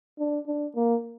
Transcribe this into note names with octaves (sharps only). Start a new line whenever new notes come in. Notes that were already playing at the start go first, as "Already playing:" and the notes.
D4
D4
A#3